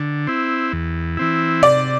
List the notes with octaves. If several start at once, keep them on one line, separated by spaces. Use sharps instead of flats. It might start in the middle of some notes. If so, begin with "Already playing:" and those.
Already playing: D3
C4 E4
E2
E3 C4 E4
C3 D5